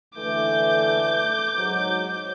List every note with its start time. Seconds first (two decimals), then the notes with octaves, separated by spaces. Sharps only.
0.17 D3 E3 A3 D6 G6
1.57 G#2 F#3